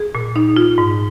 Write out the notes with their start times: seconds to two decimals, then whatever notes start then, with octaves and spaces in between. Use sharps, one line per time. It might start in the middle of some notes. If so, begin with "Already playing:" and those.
Already playing: G#4
0.15 A#2
0.36 D#4
0.56 F4
0.78 G#2